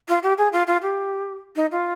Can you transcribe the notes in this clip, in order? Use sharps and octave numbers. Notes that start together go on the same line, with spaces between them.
F4
G4
G#4
F4
F4
G4
D#4
F4